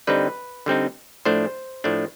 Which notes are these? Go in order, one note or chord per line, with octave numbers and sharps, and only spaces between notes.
D3 G3 C4 D#4 B4
D3 G3 C4 D#4
A2 F3 A3 D4 C5
A2 F3 A3 D4